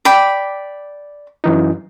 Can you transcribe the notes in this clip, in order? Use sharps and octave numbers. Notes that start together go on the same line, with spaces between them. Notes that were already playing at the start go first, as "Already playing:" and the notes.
D5 G5 B5
F#2 E3 D#4